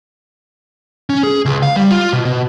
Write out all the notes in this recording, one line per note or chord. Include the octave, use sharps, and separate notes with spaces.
C#4
G#4
C#2
F5
G3
F4
B2
B2